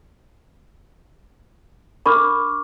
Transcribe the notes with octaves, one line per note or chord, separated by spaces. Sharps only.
D4 A#4 B5 C#6 D6 F6